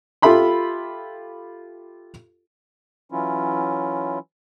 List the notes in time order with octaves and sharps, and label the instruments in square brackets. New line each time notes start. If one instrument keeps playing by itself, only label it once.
[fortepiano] F4 G4 A4 E5 B5 C6
[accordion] E3 F#3 C#4 E4 F4